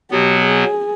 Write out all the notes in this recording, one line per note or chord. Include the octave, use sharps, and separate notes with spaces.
B2 F#3 B3 G4
G#4